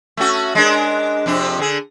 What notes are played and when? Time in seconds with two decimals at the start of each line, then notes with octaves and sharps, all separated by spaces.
0.17 A3 C#4 F#4
0.55 G#3 D4 A#4
1.26 F2 C3 D4
1.59 D3 G#4